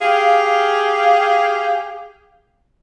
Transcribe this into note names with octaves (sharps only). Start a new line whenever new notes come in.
G4 G#4 F5